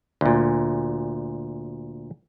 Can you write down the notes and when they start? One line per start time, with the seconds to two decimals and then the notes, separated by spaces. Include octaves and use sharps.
0.21 D2 A#2